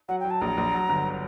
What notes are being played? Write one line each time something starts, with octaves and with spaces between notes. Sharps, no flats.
F#3 F#5
G5
F#3
A5
A#1 A#5
A#1
F#3
G1